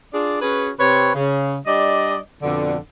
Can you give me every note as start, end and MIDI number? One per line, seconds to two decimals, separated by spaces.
0.14 0.40 62
0.14 0.40 65
0.14 0.40 68
0.14 0.40 74
0.42 0.70 61
0.42 0.70 66
0.42 0.70 68
0.42 0.70 71
0.42 0.70 73
0.79 1.11 48
0.79 1.11 60
0.79 1.11 71
0.79 1.11 73
1.15 1.55 49
1.67 2.17 55
1.67 2.17 62
1.67 2.17 74
1.67 2.17 75
2.43 2.77 41
2.43 2.77 47
2.43 2.77 50